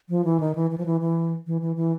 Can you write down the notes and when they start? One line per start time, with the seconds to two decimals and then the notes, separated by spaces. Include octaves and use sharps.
0.09 F3
0.25 E3
0.40 D#3
0.55 E3
0.71 E3
0.78 F3
0.86 E3
1.01 E3
1.47 E3
1.61 E3
1.76 E3